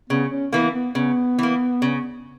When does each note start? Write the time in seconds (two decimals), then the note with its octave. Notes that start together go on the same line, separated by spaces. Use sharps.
0.10 C#3 B3
0.31 C#4
0.52 E3 A#3 B3
0.74 B3
0.95 C#3 B3
1.39 E3 A#3
1.82 C#3